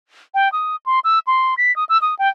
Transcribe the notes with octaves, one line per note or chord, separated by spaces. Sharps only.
G5
D#6
C6
E6
C6
B6
D#6
E6
D#6
G5